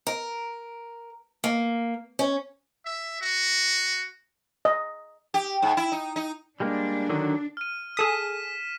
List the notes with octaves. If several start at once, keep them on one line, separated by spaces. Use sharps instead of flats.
A#4
A#3
C#4
E5
F#4
D#5
G4
G#2
E4
D#4
D#4
G3 G#3 A#3 D4
D3 D#3 F#3
F6 D#7
G#4 A4 D#6 B6 E7